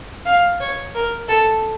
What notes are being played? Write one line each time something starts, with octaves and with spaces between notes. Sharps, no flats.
F5
C#5
A#4
A4